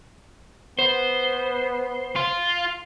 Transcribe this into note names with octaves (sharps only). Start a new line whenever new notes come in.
B3 C5
F4